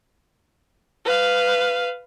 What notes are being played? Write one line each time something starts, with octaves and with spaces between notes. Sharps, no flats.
B4 F5